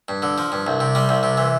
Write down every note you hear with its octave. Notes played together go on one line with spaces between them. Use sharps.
G2
D3
F3
G2
C2
C3
G3
C2
C3
E3